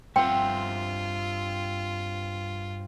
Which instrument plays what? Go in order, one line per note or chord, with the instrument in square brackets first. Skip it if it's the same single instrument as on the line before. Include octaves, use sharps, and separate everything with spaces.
[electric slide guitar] G2 E5 F#5 [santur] C4 C5 [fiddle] F4 [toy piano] G5